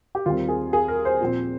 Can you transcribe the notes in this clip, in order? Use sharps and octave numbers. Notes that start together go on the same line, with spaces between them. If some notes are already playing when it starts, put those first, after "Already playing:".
G4
D#2 D#3 G3 C4 F4
G#4
G#4
A#4
C5
A#2 F3 C4